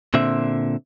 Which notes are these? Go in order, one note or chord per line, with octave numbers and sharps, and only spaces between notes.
A#2 D3 C4 E5